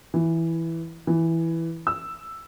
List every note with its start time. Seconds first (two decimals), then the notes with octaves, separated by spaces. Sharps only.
0.14 E3
1.07 E3
1.87 E6